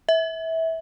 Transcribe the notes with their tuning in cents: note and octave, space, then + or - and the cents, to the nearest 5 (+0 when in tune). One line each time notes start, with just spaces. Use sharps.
E5 -20